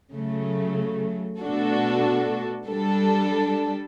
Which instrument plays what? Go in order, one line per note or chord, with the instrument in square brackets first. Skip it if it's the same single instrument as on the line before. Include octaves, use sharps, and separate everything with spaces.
[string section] C#3 F#3 A3
B2 A3 D4 F#4 A4
G3 D4 A4